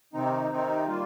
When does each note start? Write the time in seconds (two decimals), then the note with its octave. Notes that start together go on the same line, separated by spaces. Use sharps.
0.13 C3 D#3 C4 D#4
0.50 C3 D#3 C4 D#4
0.86 D#3 G3 A#3 F4